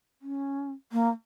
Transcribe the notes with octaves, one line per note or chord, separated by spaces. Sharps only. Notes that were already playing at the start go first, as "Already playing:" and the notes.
C#4
A#3